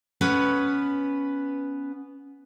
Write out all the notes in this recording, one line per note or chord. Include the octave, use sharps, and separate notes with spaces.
B3 C#4 B4 F#5